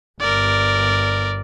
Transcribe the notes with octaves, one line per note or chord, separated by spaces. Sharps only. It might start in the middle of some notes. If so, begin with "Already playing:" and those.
G1 A#4 D5